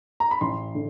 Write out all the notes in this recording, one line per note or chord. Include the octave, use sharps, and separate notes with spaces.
A#5
B5
A1 C6
D3